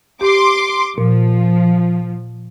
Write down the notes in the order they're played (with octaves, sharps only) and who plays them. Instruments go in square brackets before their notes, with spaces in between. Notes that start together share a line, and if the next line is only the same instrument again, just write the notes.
[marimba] G4 [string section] C6 D6
[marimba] A#2 [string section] F3